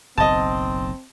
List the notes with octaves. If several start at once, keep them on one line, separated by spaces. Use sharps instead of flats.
F#1 B1 C4 D#5 A5